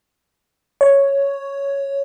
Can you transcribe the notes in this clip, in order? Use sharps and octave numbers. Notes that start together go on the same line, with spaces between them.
C#5